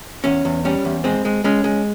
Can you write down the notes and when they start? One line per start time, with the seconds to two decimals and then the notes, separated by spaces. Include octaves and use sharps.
0.24 E2 C#4
0.45 E2
0.65 G3 C#4
0.85 E2
1.04 G#3 C4
1.25 G#3
1.44 G#3 C#4
1.64 G#3